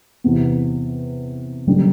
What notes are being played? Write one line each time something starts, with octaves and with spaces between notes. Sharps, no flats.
E2 C3 E3 B3
F#1 F#2 D3 G3